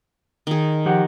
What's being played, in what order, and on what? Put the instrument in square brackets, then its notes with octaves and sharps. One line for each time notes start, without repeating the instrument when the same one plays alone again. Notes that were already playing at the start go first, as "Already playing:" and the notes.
[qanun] D#3 G#4
[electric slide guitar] F3 G4 F#5